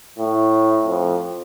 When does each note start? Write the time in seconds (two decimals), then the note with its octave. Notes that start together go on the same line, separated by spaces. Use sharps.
0.19 A2
0.86 F2